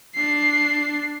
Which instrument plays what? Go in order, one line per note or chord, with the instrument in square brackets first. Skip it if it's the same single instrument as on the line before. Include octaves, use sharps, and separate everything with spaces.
[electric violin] D4 C7